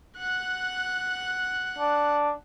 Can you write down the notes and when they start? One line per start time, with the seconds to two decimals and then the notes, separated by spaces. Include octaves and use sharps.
0.18 F#5 F#6
1.79 D4